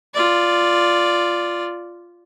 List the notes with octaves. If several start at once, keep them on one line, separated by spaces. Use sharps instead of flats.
F4 D5